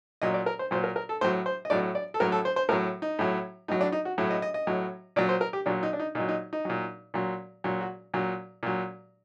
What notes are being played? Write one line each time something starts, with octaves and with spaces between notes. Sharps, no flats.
A#2 F#3 D#5
D5
A#4
C5
A#2 F#3 C5
A#4
A#4
A4
A2 F#3 C5
C5
D#5
A2 F#3 D5
D5
A4
A2 F#3 A#4
A4
C5
C5
A2 F#3 A#4
D#4
A2 F#3
A2 F#3 D#4
D4
D#4
F#4
A2 F#3
D#5
D#5
D#5
A2 F#3
A#2 F#3 D5
C5
A#4
G4
A#2 F#3 D4
D#4
D4
D#4
A#2 D#4
F#3
D#4
D#4
A#2 F#3
A#2 F#3
A#2 F#3
F#4
A#2 F#3
A#2 F#3